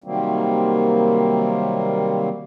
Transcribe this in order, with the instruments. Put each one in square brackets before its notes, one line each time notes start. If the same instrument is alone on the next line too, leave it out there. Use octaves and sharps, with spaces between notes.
[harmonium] C3 D#3 F#3 G3 A#3 C4